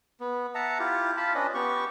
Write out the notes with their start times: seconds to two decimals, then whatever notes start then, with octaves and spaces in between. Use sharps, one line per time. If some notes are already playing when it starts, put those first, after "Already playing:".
0.20 B3
0.55 E5 F#5 A5 A#5
0.79 E4 F4 G4
1.17 F4 A5 B5
1.35 C#4 D4 B4 D#5
1.54 B3 G4 C#6